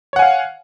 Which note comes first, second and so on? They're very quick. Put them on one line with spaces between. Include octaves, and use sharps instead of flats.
C#5 F#5 G#5 F5